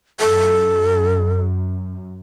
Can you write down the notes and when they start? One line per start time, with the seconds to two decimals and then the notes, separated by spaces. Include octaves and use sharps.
0.20 F#2 A4